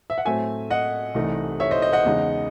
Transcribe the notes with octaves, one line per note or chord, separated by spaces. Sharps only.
E5
F#5
A2 F#3 A3 C4 E5 G#5
D#5 F#5
C2 C3 E3 A3 D#4
C#5 E5
C5 D#5
C5 D#5
D#5 F#5
E2 C#3 G#3 D#4